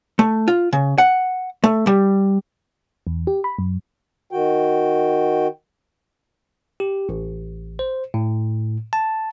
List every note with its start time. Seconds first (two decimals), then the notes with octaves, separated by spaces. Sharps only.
0.19 A3
0.48 F4
0.73 C#3
0.98 F#5
1.64 A3
1.87 G3
3.07 E2
3.27 G4
3.44 B5
3.58 F#2
4.31 D#3 F#4 G5
6.80 G4
7.09 A1
7.79 C5
8.14 A2
8.93 A5